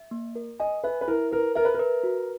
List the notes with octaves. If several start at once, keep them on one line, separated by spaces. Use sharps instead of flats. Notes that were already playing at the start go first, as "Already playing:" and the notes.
Already playing: E5
A#3
A#4
D#5 G#5
B4 E5
B4
E4 A#4
A#4 B4
A#4 E5
B4
A#4
B4
F#4